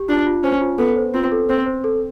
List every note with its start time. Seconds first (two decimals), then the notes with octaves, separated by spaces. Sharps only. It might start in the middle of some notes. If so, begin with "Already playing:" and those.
Already playing: G4
0.08 D4 F4
0.27 F4
0.44 C#4 C5
0.61 F4
0.78 B3 A4
0.96 C5
1.14 C4 F4
1.32 A4
1.49 C4 C5
1.66 C5
1.84 A4